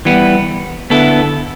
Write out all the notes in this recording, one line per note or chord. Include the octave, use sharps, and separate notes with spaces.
E3 G3 B3
D3 B3 E4 A4